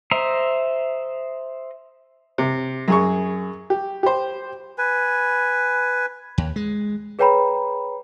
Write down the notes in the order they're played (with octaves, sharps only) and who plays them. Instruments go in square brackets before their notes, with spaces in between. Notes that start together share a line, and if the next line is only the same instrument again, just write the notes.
[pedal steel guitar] C5 D#5 E5 A#5
[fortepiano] C3
F#2 G#4 C#6
G4
G4 C5
[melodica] B4 G#5
[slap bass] D#2
G#3
[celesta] G#4 B4 C#5 G5 A#5 B5